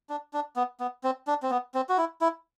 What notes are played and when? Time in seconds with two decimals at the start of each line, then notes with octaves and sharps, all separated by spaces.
0.09 D4
0.33 D4
0.56 B3
0.80 B3
1.04 C4
1.27 D4
1.42 C4
1.50 B3
1.74 C4
1.89 F#4
1.98 E4
2.21 E4